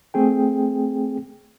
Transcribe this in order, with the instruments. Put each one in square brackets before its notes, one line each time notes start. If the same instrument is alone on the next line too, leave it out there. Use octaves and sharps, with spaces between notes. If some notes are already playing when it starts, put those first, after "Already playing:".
[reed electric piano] A3 C4 G#4 G5